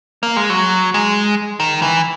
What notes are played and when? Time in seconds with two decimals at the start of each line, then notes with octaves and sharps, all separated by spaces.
0.23 A#3
0.36 G#3
0.50 F#3
0.94 G#3
1.60 D#3
1.82 E3